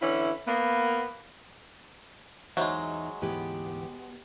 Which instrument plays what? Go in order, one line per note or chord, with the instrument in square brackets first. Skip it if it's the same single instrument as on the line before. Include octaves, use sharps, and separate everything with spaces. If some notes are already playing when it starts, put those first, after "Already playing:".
[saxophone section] D3 E3 C#4 E4
A#3 B3
[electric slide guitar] E2 D#4 [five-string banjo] F#3 G#3 [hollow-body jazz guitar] C5 E5
[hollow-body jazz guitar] D2 G#2 E3 [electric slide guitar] B3 [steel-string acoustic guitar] G4